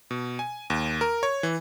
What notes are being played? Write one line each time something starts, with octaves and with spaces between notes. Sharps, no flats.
B2
G#5
D#2
A#4
C#5
E3